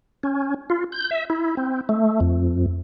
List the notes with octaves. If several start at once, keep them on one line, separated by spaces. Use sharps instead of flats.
C#4
F4
G6
E5
E4
C4
A3
F2